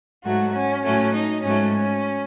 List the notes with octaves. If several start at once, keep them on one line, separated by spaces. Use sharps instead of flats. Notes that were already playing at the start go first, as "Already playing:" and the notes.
G#2 F#3 A3 F#4
C#4
A2 F#3 A3 C#4
D#4
G#2 F#3 A3 C#4
C#4